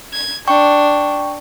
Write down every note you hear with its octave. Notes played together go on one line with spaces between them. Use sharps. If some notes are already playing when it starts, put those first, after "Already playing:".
G#6
D4 G5 C#6